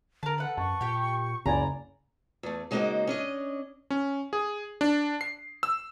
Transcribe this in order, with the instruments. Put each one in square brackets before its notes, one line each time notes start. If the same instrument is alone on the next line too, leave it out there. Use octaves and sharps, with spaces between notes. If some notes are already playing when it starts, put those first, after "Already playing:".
[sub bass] D3 [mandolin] A#4 A5
[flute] A4 [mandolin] B4 F#5
[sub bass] F#2 [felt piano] A5 [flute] C#6
[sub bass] A#2 [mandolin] G4 G5
[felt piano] F#1 G#5 [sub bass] C#2 [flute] D5 [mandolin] A#5
[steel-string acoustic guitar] E2 A3
C#3 G#3 A#3 D#4 F#4 C5
C#4 D4 D#5
[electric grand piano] C#4
G#4
D4
C7
E6